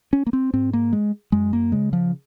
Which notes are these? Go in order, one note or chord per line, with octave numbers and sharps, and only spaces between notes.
C#4
A#3
C4
G#2 C4
A#3
G#3
F#2 G#3
A#3
C#3 G#3
F3